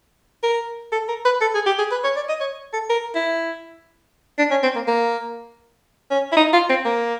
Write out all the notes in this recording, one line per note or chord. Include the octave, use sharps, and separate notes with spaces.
A#4
A4
A#4
B4
A4
G#4
G4
G#4
B4
C#5
D5
D#5
C#5
A4
A#4
E4
D4
C#4
C4
A#3
A#3
C#4
E4
D#4
F4
C4
A#3